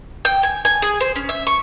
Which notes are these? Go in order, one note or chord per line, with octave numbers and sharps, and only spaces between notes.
G5
G#5
G#5
G#4
C5
C#4
E5
C#6